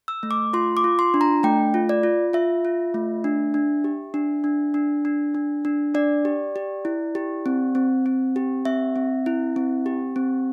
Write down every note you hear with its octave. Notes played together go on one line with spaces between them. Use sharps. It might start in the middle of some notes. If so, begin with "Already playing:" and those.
E6
A3
D6
F4 C6
D6
F4
C6
D4
A#5
A3 G5
F4
D5
F4
F4 E5
F4
A3
D4
D4
G4
D4
D4
D4
D4
D4
D4
D4 D5
G4
G4
E4
G4
C4
C4
C4
G4
C4 E5
C4
E4
C4
G4
C4